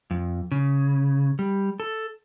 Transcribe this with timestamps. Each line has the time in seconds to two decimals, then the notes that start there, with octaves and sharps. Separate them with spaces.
0.11 F2
0.51 C#3
1.39 G3
1.80 A4